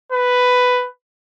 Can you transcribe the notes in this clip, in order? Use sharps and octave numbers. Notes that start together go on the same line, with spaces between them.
B4